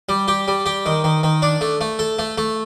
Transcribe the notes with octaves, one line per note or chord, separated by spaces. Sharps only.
G3
G4
G3
G4
D#3
D#3
D#3
D4
A3
A3
A4
A3
A3